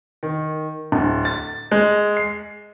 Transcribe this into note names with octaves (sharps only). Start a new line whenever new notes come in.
D#3
D1
A6
G#3
C7